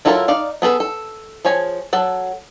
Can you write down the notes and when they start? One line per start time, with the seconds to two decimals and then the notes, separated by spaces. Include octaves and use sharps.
0.05 F#3 E4 F4 A4 A#4
0.28 D#4 D5 F5
0.62 B3 G#4 A4 B4
0.80 A4
1.45 F3 G#4 C#5 G#5
1.93 F#3 A4 F#5